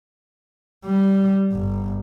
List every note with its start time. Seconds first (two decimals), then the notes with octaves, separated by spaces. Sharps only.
0.86 G3
1.53 G1